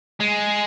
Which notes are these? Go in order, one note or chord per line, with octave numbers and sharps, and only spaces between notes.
G#3